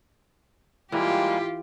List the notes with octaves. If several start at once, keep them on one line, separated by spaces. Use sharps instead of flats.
E3 G3 G#3 A#3 F4 G4